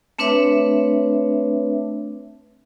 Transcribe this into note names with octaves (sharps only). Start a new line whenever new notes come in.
A3 C4 D4 B4 C#5 E5